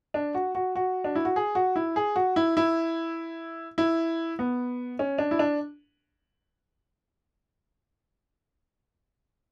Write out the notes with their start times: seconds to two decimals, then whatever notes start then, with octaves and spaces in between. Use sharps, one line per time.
0.14 D4
0.35 F#4
0.55 F#4
0.76 F#4
1.04 D4
1.15 E4
1.25 F#4
1.36 G#4
1.55 F#4
1.76 E4
1.96 G#4
2.16 F#4
2.36 E4
2.57 E4
3.78 E4
4.39 B3
4.99 C#4
5.18 D4
5.31 E4
5.39 D4